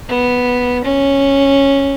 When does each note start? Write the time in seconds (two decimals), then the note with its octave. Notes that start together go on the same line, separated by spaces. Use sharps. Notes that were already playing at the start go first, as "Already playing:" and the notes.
0.09 B3
0.84 C#4